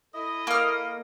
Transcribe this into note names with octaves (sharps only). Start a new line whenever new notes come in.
E4 A4 D#5
A#3 F6